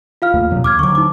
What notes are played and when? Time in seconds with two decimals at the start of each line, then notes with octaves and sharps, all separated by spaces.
0.22 F4 F5 F6
0.34 D#2 A3 A#3
0.50 E2 B2 F#3
0.64 D#2 D6 F6 G#6
0.79 D3 F#3 C#6 D6
0.95 D#4 D6